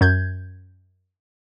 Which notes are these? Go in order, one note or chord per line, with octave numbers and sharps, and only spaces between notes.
F#2 G6 G#6